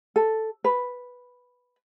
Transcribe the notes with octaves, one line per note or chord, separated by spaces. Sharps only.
A4
B4